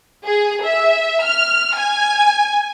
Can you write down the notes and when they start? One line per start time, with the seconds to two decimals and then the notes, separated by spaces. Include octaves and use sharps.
0.25 G#4
0.64 E5
1.23 F6
1.75 G#5